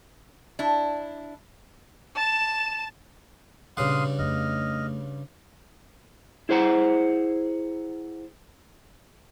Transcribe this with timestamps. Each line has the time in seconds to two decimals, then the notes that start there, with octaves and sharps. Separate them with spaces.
0.59 D4 E4
2.16 A5 E7
3.77 G2 A#2 C#3 C4 F5 F#5 C6 D#6
4.19 F2 A3 D#5 F6
6.49 E4 G#4 C5 F#5 A#5